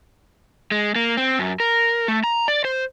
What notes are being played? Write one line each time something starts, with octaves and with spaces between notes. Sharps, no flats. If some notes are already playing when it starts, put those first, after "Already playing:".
G#3
A#3
C4
F#2
A#4
A3
A#5
D5
C5